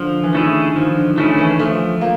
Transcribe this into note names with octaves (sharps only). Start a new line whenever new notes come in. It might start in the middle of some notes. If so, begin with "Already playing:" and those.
Already playing: D3 F3
E3
D#3 A3 C#4 E4 G#4
D#3 F3
D3
D#3 A3 C#4 E4 G#4
E3
F3 A3
A#3